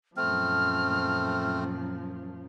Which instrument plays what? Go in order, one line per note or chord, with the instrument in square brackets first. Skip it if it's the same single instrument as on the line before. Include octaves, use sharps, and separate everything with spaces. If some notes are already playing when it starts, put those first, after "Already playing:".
[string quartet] F#2 A#2 F3 [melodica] A3 C4 [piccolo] F6